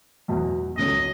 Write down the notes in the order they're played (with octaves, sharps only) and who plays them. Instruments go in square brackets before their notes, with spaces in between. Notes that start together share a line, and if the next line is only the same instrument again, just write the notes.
[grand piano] E2 B2 F#3
[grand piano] C#2 C#3 F#3 A3 C#4 [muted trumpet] D#5